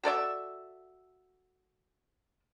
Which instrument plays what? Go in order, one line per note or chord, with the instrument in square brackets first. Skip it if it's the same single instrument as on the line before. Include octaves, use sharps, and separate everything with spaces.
[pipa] F#4 A4 D5 E5